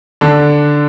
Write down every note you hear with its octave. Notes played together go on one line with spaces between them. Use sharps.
D3 D4